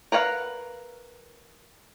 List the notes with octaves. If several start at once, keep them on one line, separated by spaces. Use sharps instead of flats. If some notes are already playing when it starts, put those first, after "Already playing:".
A#4 B4 C#5 F5 F#5